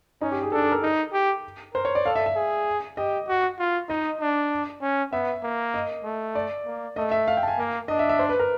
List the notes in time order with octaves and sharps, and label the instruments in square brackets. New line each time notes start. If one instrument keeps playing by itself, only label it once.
[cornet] C#4 [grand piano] D#4
[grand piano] G4
G#4
[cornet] D4 [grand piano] A4
[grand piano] A4
A#4
[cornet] D#4
G4
[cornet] A#4 [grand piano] C5
[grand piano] C#5
D5
[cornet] A4 [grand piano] F5
[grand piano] E5
E5
[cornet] G#4
[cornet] G4 [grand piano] D#5
[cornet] F#4
F4
[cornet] D#4 [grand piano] D#5
[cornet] D4
C#4
[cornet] B3 [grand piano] E5
[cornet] A#3
[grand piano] D#5
[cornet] A3
[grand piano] D5
[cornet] A#3
[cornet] A3 [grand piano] D#5
[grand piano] E5
F5
G5
A5
G#5
[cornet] A#3
[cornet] D4 [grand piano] D#5
[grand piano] E5
E5
C5
B4
A#4